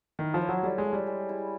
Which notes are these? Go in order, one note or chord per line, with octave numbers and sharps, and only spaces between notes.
D#3 E4
F3
C#5
F#3
G3 A4
G#3
E5
G3
G#3
E4